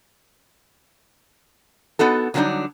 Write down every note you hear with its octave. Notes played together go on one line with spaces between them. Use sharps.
B3 D#4 F#4 A4
D3 F#3 G3 B3 D4 D#4